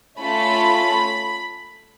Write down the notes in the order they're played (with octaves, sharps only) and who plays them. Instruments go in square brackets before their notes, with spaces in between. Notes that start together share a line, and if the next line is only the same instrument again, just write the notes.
[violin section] A3 C#4 F4 A4 B5